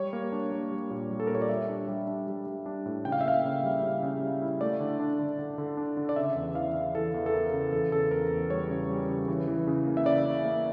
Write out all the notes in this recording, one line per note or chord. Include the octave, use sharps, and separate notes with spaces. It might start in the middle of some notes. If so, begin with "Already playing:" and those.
Already playing: G3 C#5
A#3
D4
A#3
G3
A#2
G3
A4
A#2 A#4
C#5
D5
G3 E5
D4
G3
D4
G3
G3
D4
A2
C#3 G5
F5
E5
A#3 F5
C#3
G3
C#3
C#3
G3
E4
A3 D5
D3
D4
D3
D3
D3
D4
D3
D5
C#3 E5
E2
E3 F5
E3
E3 A4
E2
A4
E3 A#4
C#3
E2 A4
C#3 A4
E2 A#4
E2
G3 C#5
C#3
G3
C#3
E3
E3
C#3
A#3
E5
C#3 D5
C#4
A#3